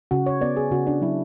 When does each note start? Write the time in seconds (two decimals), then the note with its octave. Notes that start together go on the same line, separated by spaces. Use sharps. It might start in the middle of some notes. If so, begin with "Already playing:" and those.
0.11 C#3 F#4
0.26 C#5
0.41 B3 D5
0.57 G#4
0.71 C#3 F#4
0.87 D4
1.01 F#3 E4